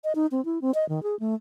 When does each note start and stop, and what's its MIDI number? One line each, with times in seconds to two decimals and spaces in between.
0.04 0.13 75
0.15 0.26 63
0.31 0.44 60
0.45 0.61 64
0.62 0.71 60
0.74 0.87 75
0.89 1.03 51
1.03 1.18 68
1.20 1.35 57